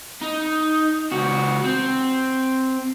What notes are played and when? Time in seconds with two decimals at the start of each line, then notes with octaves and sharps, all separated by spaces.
0.22 D#4
1.12 C#2 F#4
1.64 C4